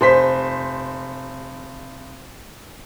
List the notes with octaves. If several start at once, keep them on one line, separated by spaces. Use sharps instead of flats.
F1 C5 B6